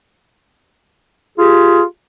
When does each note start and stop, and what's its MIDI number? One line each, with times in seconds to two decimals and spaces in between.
1.38 1.82 65
1.38 1.82 67
1.38 1.82 68